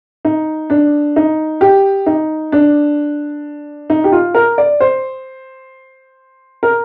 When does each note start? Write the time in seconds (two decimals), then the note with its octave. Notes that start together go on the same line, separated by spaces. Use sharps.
0.25 D#4
0.70 D4
1.16 D#4
1.61 G4
2.06 D#4
2.52 D4
3.90 D#4
4.04 G4
4.12 F4
4.35 A#4
4.58 D5
4.80 C5
6.63 A#4